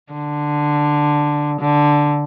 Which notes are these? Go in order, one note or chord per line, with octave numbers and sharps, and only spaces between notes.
D3
D3